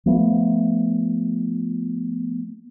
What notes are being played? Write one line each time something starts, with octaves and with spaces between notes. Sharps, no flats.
F3 A3 B3